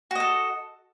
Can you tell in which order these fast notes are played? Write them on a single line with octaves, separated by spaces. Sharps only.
F#4 D#5 A4